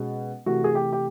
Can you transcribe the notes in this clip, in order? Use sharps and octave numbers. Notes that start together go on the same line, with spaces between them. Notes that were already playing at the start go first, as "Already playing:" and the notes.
Already playing: B2 G#3 C#4
C3 E3 A3 F#4
G#4
G4
G4